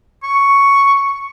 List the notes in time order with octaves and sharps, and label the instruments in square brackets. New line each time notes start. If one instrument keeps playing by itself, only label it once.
[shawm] C#6